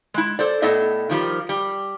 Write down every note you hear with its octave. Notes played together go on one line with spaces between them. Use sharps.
G#3 E4
A4 C5 D5
A2 B3 A4 D#5 E5
D#3 F3 G3
G3